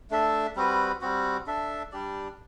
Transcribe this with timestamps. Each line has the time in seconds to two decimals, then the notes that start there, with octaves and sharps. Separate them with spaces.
0.10 A3 D4 A4 E5
0.56 G3 C4 F#4 B4
1.01 G3 C4 F#4
1.47 D4 A4 E5
1.92 G3 D4 G4 D5